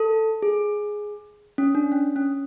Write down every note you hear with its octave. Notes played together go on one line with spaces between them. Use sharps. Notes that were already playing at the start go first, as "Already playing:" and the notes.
Already playing: A4
G#4
C#4
D4
C#4
C#4